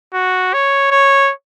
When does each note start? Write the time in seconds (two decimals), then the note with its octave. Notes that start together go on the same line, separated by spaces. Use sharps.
0.14 F#4
0.54 C#5
0.92 C#5